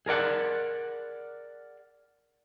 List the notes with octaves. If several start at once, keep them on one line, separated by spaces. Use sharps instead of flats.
G#4 A#4 D5 F#5